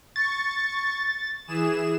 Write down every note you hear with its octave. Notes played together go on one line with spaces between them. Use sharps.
C#6 A6
E3 G#4 E7